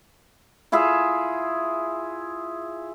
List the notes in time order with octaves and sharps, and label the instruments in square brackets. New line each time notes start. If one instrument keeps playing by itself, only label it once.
[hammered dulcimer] E4 F4 G#4 E5